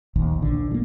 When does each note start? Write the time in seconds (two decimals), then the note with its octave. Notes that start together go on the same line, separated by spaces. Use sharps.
0.16 A#1 D#2
0.42 A#1 D3
0.71 E3 A#3